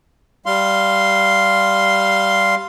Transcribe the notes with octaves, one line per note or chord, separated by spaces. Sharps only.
G3 F5 C6